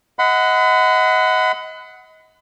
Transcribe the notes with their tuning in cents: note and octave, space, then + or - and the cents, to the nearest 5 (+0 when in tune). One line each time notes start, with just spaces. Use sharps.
D#5 +30 F#5 +0 B5 +40